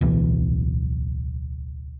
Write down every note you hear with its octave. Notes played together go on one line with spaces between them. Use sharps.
D1 B1 E3